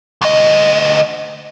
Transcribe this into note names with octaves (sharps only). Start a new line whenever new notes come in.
D2 D#5